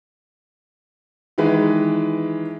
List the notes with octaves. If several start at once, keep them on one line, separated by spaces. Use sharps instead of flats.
D#3 E3 G#3 B4